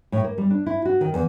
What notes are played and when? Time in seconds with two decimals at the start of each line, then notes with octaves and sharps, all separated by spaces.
0.12 A2
0.24 A#3
0.38 G3
0.50 D4
0.66 E4
0.85 F#4
1.01 D#3
1.14 E2